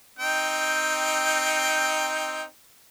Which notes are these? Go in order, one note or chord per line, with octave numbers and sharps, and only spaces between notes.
C4 D#4 G5